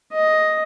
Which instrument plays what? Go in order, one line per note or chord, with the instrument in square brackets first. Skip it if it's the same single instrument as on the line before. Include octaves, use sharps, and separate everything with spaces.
[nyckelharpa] D#5